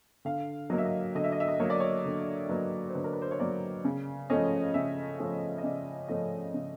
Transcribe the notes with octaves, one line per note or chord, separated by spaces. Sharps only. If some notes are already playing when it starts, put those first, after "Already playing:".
D3 F5
F#3 A#3 D#5
E5
D#5
D3 D#5
E5
D#5
E5
D#5
F#3 A#3 C#5
D5
C#5
D3
F#3 A#3 B4
C5
D3 B4
A#4
B4
C5
C#5
F#3 A#3 D5
C#3
F3 A3 C#4 D#5
C#3 E5
F3 A3 C#4
D#5
C#3 D5
F3 A3 C#4 D#5
C#3